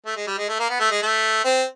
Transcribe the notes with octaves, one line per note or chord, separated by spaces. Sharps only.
A3
G#3
G3
G#3
A3
A#3
B3
A3
G#3
A3
C4